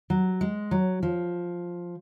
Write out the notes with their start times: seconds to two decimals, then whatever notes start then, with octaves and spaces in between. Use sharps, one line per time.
0.10 F#3
0.41 G#3
0.71 F#3
1.03 F3